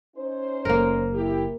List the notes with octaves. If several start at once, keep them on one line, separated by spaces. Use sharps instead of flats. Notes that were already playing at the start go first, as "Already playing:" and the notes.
C#4 D#4 C5
F#1 A#3 A#4
E4 G4